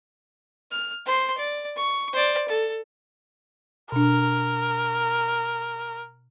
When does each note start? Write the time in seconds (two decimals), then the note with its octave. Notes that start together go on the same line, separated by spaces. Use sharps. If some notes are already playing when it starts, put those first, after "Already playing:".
0.72 F6
1.06 C5 C6
1.38 D5
1.76 C#6
2.13 C5 D5
2.48 A4
3.92 B2 D4 A#4